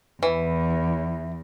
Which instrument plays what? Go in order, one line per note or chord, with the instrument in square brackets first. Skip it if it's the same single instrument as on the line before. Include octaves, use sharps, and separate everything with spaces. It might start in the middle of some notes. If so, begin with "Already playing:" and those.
[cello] E2 [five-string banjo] E3